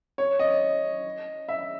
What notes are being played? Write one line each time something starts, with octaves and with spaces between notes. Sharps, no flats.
C#5
D#5
E5